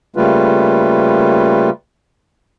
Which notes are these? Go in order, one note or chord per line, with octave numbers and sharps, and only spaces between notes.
C#3 G3 A3 A#3 F4 B4